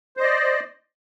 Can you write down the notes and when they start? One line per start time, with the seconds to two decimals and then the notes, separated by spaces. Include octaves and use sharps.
0.17 C5
0.20 D#5
0.23 D5